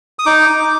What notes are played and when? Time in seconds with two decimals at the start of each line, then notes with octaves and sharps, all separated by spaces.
0.19 D#6
0.26 D#4 D6
0.49 D#4